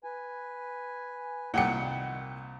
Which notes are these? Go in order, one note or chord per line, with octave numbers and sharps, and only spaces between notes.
B4 G#5
C2 A#2 D#3 F#5 G5 C#7